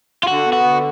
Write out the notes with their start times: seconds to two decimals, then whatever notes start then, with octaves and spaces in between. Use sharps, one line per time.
0.23 F4
0.27 D3 F#4
0.46 B3
0.53 F#4
0.64 D3